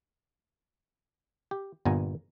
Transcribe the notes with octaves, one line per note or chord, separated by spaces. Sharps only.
G4
G1 G2 A#2 B3 G#5 A#5